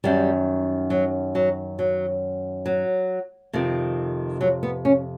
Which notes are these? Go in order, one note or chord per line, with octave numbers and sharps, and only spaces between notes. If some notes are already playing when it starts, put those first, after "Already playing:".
F#2 D#3 G3
F#3
F#3
F#3
F#3
F2 C3 D#3
F#3
B3
C#4